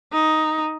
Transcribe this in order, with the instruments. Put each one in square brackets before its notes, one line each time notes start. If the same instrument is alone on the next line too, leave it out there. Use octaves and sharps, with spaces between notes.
[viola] D#4